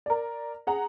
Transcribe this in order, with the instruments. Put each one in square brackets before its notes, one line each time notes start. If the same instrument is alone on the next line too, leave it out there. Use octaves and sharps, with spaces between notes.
[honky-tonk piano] A#4 D5
G#4 F#5 A#5